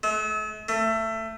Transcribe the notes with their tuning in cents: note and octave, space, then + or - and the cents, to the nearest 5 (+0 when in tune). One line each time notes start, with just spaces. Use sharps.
A3 -45
A3 +20